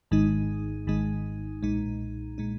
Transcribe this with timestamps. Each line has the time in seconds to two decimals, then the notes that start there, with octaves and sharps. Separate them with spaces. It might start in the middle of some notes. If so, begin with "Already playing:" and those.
0.11 G#1 G#2 D#3 G#3 D#4
0.87 G#1 G#2 D#3 G#3 D#4
1.63 B1 A#2 G#3 D#4
2.38 A#2 G#3 D#4